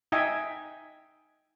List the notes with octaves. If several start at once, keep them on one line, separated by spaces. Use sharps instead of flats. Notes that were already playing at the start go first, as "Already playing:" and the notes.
D#4 D#5 E5 G5 G#5